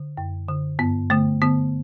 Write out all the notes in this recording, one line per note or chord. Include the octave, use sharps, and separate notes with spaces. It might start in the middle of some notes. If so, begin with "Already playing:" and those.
Already playing: D3
F#2
D3
G2 B3
D3 A3
D3 B3